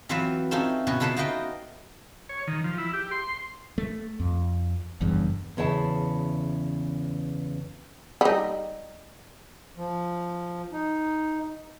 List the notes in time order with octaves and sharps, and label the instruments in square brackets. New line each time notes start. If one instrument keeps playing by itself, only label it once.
[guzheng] E3 F#3 C4 F4 B4 E5
A3 C4 C#4 D#4 F4 A4
B2 B3 C#4 F#4
E4 F4 A4 B4 C5 F#5
D#4 F4 F#4 B4 D#5 G5
[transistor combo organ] C#5
D#3
F3
E4
G4
C6
[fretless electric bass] A3
F2
F#1 E2 G2
[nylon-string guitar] E2 C#3 E4 E5 A5
[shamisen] G3 D#4
[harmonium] F3
D#4